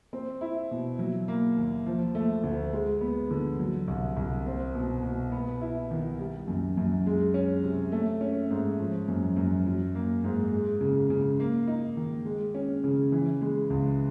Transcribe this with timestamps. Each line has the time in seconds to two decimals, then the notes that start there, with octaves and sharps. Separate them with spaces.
0.13 C4
0.41 E4
0.71 B2
0.99 F#3
1.28 A#3
1.57 D#2
1.86 F3
2.15 A3
2.44 D2
2.73 G#3
3.01 B3
3.31 D3
3.59 F#3
3.88 C2
4.16 C2
4.46 C4
4.75 B2
5.03 B2
5.32 B3
5.61 E4
5.91 D#3
6.20 G3
6.48 F#2
6.77 F#2
7.06 G#3
7.34 C#4
7.64 C3
7.92 A3
8.21 C#4
8.51 G#2
8.79 F3
9.08 F#2
9.36 F#2
9.66 F#3
9.95 A#3
10.24 G#2
10.53 G#3
10.81 C#3
11.10 C#3
11.40 A#3
11.67 D#4
11.97 D#3
12.25 G#3
12.55 C#4
12.84 C#3
13.12 E3
13.41 G#3
13.70 C#2